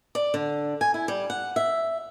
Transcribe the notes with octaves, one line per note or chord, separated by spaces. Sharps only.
D5
D3
G#5
E4
G3
F#5
E5